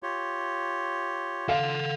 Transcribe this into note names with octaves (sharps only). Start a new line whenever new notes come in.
F4 G4 C#5
F4 A4 F5 F#5